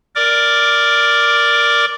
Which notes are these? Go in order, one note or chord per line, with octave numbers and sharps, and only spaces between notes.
A#4 D5 D6